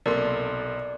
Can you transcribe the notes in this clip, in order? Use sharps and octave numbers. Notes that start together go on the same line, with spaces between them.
B1 C3 A#3 A4 D5 C6